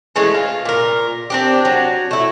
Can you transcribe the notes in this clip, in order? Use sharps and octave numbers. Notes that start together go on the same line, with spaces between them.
E3 G#3 A3 C#4
F4
A#2 A#4
C4 D4 G4
F#3
A3 E4